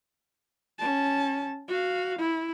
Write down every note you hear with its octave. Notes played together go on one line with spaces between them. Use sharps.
C#4 A5
F#4 F5
E4